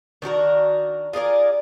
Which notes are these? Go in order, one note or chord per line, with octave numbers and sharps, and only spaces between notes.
D#3 D4 F#4 A#4
F4 G#4 A#4 D5